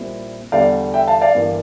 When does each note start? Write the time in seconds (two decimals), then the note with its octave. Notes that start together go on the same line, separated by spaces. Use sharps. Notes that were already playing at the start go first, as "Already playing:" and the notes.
Already playing: A#1 A#2 G3 C4 E4
0.52 E2 D3 G3 D5 F5
0.94 E5 G5
1.07 F5 A5
1.21 D5 F5
1.35 G1 G2 E3 A#3